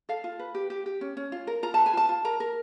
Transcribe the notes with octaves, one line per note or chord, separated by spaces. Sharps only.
A4 F5
F4
B4
G4
G4
G4
C#4
C#4
F4
A#4
F4 A#5
B4 A5
G#5
F4 A5
F4
A#4 A#5
A#4